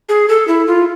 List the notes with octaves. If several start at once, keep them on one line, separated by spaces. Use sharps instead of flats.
G#4
A4
E4
F4